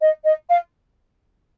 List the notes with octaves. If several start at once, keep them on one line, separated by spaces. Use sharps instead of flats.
D#5
D#5
F5